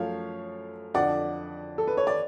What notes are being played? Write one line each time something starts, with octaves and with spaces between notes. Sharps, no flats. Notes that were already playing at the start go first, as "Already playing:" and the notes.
Already playing: F#2 F3 A3 C#5 F5
F2 D3 F3 D5 F#5
A4
B4
C#5
D5